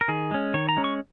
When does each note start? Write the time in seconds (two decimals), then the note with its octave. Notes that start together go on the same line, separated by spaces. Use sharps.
0.01 A#4
0.08 D#3 G#4
0.31 G#3 C#4
0.54 D#3 C#5
0.69 A#5
0.77 G#3 C#4
0.84 C#6